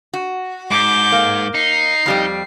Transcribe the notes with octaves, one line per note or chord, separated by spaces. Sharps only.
F#4
G#2 D6 G6
A#3
D#4 C7
F2 G3 G4